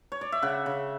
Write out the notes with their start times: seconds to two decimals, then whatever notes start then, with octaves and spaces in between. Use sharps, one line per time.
0.12 C#5
0.21 D5
0.32 E5
0.42 C#3 F#5
0.66 C#3